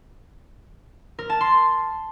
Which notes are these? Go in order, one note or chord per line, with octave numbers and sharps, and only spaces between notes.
A#4
A5
C6